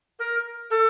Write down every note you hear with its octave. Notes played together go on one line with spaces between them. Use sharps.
A#4
A4